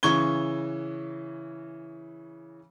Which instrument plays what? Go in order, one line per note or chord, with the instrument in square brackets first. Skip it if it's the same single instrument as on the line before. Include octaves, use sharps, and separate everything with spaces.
[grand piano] C#3 E3 C#6 G#6 G7